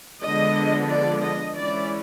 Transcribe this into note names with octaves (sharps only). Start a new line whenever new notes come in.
D3 F3 G#3 B3 D4 D#5
D5
D#5
E3 G#3 C#4 E4 D5